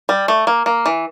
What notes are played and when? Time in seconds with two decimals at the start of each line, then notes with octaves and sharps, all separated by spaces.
0.09 G3
0.28 A3
0.47 A#3
0.66 A#3
0.86 E3